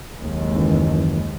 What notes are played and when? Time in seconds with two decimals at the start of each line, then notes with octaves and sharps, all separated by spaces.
0.19 F#1 D#2 G#3
0.55 F#2 D#3 E3